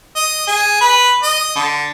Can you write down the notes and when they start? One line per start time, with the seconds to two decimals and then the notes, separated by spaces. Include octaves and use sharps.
0.16 D#5
0.47 G#4
0.81 B4
1.23 D#5
1.56 D3